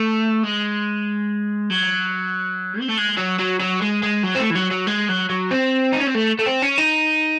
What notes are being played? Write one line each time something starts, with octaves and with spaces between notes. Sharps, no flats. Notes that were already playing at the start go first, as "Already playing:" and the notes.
Already playing: A3
G#3
F#3
C4
A3
G#3
F#3
F#3
F#3
G#3
G#3
F#3
C4
A3
E3
F#3
F#3
G#3
F#3
F#3
C4
D#4
C#4
C4
A3
A3
C4
C#4
D#4